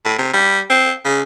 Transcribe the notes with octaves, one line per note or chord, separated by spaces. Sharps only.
A2
C3
G3
C4
C#3